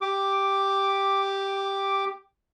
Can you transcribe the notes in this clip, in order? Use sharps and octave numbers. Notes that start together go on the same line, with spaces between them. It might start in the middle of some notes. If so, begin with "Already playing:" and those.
G4 D6